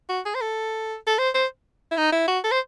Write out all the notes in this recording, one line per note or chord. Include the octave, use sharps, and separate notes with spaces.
F#4
G#4
C5
A4
A4
C5
C5
E4
D#4
E4
F#4
A4
C5